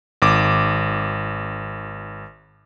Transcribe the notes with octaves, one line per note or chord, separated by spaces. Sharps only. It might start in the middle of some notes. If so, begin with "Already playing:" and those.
G#1 D6